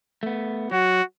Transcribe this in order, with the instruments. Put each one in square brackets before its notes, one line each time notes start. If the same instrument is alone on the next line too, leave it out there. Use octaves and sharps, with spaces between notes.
[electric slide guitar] A3 B3
[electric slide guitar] F#3 [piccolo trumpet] F#4